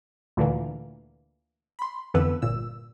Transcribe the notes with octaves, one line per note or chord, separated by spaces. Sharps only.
D2 A#2 D3 E3 A#3
B5 C6
F2 D3 E3 B3 B4 E6
G1 A#2 E6